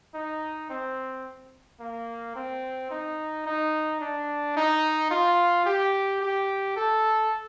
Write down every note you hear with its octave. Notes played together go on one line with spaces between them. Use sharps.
D#4
C4
A#3
C4
D#4
D#4
D4
D#4
F4
G4
G4
A4